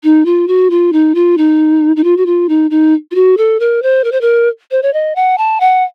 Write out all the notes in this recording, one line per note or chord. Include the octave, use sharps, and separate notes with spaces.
D#4
F4
F#4
F4
D#4
F4
D#4
D#4
F4
F#4
F4
D#4
D#4
F4
F#4
A4
A#4
C5
A#4
C5
A#4
C5
C#5
D#5
F#5
A5
F#5